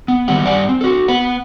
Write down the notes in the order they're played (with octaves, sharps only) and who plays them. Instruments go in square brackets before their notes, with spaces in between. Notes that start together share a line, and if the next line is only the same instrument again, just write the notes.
[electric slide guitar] B3
D#3 G3 B3 G4 F#5
G2 G3 D5 F#5 G#5
C4
F#4 A4
B3 B4 F#5